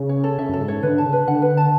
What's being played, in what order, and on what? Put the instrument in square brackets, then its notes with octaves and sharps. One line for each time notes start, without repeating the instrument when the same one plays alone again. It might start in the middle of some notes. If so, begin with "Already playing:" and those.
Already playing: [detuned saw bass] C#3
[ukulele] C#5
A4
[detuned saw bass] C#3 [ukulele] E5
[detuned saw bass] F#2 [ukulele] A4
[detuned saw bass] G#2
[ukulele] C#5
[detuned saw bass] D3 [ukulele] B4
[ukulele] A5
[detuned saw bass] C#3
[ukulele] B4
[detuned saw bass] D3 [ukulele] F#5
[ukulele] B4
A5